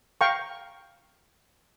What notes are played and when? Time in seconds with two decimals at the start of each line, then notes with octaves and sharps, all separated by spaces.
0.21 F5 G5 A#5 C#6